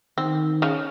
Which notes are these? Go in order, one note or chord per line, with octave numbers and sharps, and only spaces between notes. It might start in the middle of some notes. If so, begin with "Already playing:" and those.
D#3 C4
C#3 C#4